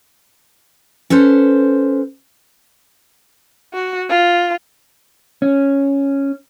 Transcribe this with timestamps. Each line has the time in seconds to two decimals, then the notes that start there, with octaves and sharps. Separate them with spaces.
1.10 C#4 A4 B4 C5
3.74 F#4
4.10 F4
5.42 C#4